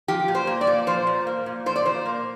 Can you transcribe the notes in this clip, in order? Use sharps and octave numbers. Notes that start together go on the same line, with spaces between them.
F3 G4
A#2
C5
A#3
D5
A#2
F3 C5
A#2
A#3
A#2
F3 C5
D5
A#2 C5
A#3